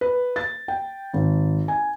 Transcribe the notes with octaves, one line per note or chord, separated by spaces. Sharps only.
B4
A6
G5
G#1
G#5